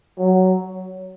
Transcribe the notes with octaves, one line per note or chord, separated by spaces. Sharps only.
F#3